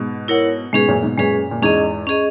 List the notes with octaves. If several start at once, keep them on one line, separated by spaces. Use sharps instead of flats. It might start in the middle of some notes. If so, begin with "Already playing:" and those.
Already playing: G#2 B2
E4 A#4 C#5 F#5
G#2 B2 G#3 C#4 G#4 B4
F#2 A#2
G#2 B2
F#2 A#2 G#3 C#4 G#4 B4
A#2
E2 G#2 C#4 G#4 D#5
C#4 G#4 D#5